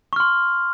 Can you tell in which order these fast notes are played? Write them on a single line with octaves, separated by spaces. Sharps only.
C#6 F6 C6